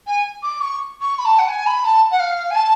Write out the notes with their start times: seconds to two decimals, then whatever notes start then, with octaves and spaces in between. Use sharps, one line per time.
0.07 G#5
0.43 D6
0.61 C#6
1.01 C#6
1.19 B5
1.25 A5
1.39 F#5
1.48 G#5
1.66 B5
1.85 A5
2.11 F#5
2.20 F5
2.51 G#5
2.55 A5